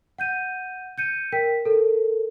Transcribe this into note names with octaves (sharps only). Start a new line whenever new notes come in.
F#5 G6 D#7
G6 C#7 D#7
A#4 G5 B6
A4 A#4